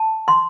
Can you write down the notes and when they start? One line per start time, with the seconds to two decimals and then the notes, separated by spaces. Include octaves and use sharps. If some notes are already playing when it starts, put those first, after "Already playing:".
Already playing: A5
0.28 C6